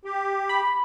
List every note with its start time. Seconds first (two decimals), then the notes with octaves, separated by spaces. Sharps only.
0.05 G4
0.49 B5